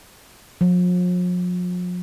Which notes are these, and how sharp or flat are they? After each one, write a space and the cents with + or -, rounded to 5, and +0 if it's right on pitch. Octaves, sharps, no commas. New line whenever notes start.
F3 +45